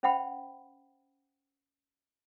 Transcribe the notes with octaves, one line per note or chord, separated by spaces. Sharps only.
C#4 C5 E5 F#5 G5 B5